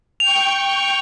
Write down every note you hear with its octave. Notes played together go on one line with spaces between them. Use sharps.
G5 C#6 F7